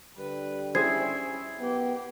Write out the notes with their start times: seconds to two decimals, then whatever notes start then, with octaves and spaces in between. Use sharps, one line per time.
0.17 D3 G3 B4
0.75 C#4 E4 G#4 C5 G#6 C7
1.60 F#2 B3 G4